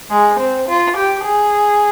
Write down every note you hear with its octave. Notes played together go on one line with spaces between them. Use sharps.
G#3
C4
F4
G4
G#4